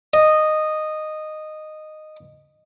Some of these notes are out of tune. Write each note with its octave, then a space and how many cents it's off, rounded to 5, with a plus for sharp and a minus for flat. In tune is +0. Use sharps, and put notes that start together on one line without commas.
D#5 -10